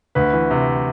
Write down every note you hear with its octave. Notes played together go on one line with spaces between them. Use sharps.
D2 B4
E3
C3